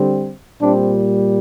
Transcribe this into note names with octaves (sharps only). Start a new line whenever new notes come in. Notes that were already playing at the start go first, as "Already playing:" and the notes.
Already playing: D3 G3 C4
A#2 G3 C4 D4